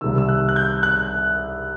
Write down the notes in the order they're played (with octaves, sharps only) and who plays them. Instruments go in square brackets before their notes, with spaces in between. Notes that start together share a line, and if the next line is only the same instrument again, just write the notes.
[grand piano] C2 C3 D#3 E6
E6
F#6
F#6
G6
F#6